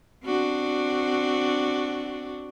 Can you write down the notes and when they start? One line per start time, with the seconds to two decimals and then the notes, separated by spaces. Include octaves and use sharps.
0.25 C4 D4 F#4